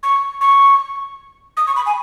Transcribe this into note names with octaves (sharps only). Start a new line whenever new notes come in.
C#6
C#6
D#6
C#6
B5
G#5